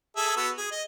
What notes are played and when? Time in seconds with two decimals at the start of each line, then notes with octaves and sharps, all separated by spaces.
0.16 G#4 A4 E5
0.37 B3 F#4 E6
0.58 G#4
0.72 D#5